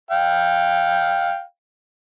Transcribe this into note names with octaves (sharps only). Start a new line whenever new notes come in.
F5 G5